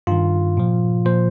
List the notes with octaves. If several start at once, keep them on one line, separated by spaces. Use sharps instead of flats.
G2 D#3 F4
A#2 F3
A#2 F3 C5